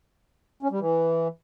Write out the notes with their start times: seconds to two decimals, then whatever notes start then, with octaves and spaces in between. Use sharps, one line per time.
0.63 C#4
0.71 G3
0.80 E3